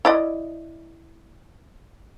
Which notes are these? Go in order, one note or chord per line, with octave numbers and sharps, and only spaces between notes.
E4 D5 D#5